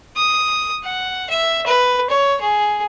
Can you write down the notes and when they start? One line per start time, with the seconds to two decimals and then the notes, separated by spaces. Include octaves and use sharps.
0.16 D#6
0.84 F#5
1.30 E5
1.66 B4
2.10 C#5
2.41 G#4